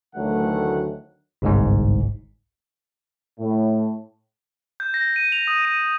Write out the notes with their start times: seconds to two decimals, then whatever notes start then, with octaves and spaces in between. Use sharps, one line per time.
0.15 D2 D#3 E3 F#3 A3 F#5
1.42 G1 C2 G#2
3.39 A2
4.80 G6
4.94 A#6
5.16 D#7
5.32 F7
5.47 D#6
5.65 D#7